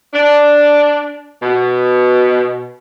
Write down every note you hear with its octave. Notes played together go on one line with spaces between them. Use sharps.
D4
B2